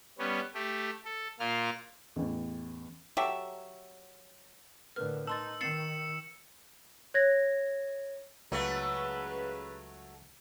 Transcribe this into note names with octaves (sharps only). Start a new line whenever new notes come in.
G3 B3 C#4
A3 G4
A4
A#2 A#3 F4 F6
A1 E2
F#3 G4 A4 E5
A2 D3 A#4 B4 F6
D#4 A5 C6 E6 A6
D#3 E6 A6 C7 C#7 E7
C#5 G#6 A#6
C#2 C#3 F#3 A3 B4